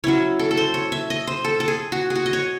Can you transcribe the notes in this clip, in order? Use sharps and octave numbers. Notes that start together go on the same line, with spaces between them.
F#3 C#4 E4 C#5
A4
A4
C5
C#5
E5
D#5
C5
A4
A4
G#4
F#4
G#4
F#4
D#5
C#5